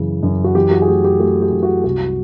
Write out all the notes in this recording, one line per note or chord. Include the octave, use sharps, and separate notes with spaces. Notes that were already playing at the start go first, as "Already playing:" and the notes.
Already playing: F#2 C#3 E3
F#2
F#4
E3 G4
F#4
G#4
A3 G4
G4
A3 F#4
G4
F#2
F#4
C2 F#4